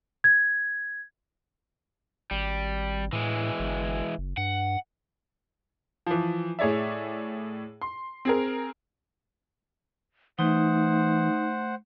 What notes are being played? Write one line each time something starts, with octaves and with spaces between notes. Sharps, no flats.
G#6
G#1 G3
A2 E3 G#3
G1
F#1
G2 F#5
E3 F3
A2 G#4 C#5 D5 E5
C6
C4 G#4 A#4
E3 A3 D#4 C5 F#5